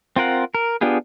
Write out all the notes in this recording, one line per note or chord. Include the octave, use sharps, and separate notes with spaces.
C4 F4 A#4 F#5
A#4
B3 D4 F4 G4 G#4